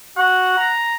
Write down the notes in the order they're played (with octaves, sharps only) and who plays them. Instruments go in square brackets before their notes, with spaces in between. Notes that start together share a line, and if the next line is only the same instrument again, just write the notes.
[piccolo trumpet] F#4 [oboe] F#5
[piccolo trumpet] A#5